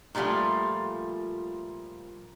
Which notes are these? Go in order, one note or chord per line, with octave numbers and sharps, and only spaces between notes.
A#2 F3 G3 A3 F4